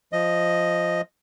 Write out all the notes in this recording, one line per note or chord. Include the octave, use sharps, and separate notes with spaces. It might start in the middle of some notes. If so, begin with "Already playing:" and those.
F3 D#5